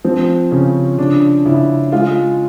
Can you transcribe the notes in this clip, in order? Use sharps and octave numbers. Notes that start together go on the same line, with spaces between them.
F3 C4
C#3 C#4
C#3 D4
C#3 E4
G#3 F4